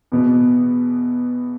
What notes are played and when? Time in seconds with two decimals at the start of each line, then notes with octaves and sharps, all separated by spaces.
0.12 E2 B2 B3